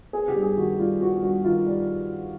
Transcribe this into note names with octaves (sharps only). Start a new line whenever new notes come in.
B3 G#4
G4
G2
G#4
D#3 F#4
G3 F4
B3 F#4
G2 F#4
D#3 F4
G3